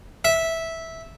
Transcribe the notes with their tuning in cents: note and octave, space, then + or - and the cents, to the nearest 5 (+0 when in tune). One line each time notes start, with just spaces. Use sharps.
E5 -10